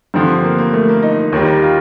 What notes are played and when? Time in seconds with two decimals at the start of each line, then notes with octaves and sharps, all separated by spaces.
0.14 G2 D3 F3 C4
0.43 A#3
0.58 A#3
0.73 A3
0.89 A#3
1.03 D#4
1.33 D#2 D#3 G3
1.63 F4